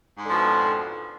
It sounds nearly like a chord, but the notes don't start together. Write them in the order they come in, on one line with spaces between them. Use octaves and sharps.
G#2 D3 F3 B2 F2